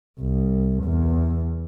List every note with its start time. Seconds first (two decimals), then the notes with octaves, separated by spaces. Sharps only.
0.20 C2
0.84 E2